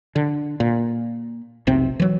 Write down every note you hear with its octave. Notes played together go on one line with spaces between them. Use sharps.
D3
A#2
F1 B1 C3 C4
E3 F#3